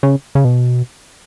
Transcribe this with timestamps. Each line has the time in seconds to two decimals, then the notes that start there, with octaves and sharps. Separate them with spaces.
0.03 C#3
0.35 C#3
0.45 B2